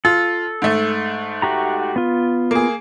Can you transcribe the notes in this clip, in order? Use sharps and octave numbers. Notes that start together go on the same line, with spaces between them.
F4 A4
G#2 A3
F#4 G4 A#5
B3 F4
A#3 G#4